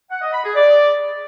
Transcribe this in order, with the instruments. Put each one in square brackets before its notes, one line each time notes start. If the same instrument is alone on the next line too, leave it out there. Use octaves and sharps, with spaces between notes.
[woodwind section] F#5
D#5
B5
G#4
D5